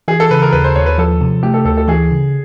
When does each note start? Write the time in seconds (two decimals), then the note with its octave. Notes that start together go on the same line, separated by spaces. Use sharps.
0.08 E3 G#4
0.20 A4
0.31 C#3 B4
0.42 A#4
0.52 D#2 B4
0.64 C5
0.75 D#2 C#5
0.86 B4
0.98 F3 A4
1.21 C3
1.43 A3 G4
1.54 A4
1.65 D2 A4
1.77 A4
1.88 E3 G#4
2.11 C#3